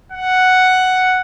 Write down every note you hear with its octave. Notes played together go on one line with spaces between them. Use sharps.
F#5